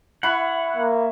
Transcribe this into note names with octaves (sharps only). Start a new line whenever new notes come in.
E4 F#5 B5 C#6
A#3